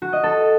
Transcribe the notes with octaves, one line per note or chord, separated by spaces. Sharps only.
F#4
D#5
A4